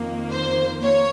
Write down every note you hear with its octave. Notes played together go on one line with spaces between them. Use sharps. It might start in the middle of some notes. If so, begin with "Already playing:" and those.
Already playing: F2 D#3 A#3
C5
A#3 C#5